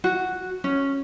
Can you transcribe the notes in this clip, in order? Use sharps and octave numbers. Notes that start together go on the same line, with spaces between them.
F#4
C#4